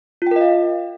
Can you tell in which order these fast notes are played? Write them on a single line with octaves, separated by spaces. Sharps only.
F4 G5 A#4 D#5 F5